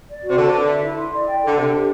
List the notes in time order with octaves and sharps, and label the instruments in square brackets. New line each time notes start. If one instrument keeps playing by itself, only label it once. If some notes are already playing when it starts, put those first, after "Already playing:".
[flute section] D5
F#4
[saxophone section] C3
[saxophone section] D3 [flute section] A5
[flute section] B4
E5
E4
C6
D5
G5
A4
[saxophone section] D3
[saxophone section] C3 [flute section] D4
[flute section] G4